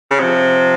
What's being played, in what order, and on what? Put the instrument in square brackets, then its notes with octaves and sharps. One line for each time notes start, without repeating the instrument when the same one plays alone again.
[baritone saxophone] C#3
[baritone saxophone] C3 [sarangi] F3